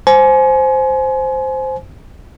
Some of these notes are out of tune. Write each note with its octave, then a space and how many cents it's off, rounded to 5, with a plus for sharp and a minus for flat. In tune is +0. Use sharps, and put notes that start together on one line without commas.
C5 +0 G#5 +30